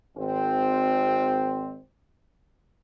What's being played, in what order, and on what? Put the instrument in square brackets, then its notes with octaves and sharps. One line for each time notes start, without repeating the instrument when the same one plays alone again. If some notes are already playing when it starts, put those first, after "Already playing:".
[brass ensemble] G#1 C4